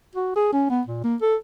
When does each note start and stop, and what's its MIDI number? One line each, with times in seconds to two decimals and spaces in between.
0.15 0.31 66
0.36 0.52 68
0.53 0.67 61
0.70 0.82 59
0.87 1.03 46
1.04 1.16 58
1.21 1.36 69